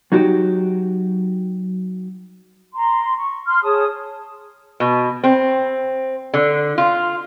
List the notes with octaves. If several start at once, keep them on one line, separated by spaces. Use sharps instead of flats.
F#3 D#4 F#4 G4
A#5 C6
C#6
C6 F6
G#4 C#5 A5 D#6
B2
C4
D3
F4